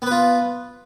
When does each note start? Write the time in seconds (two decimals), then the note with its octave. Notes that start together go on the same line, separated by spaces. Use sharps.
0.02 B3
0.07 B4
0.11 F4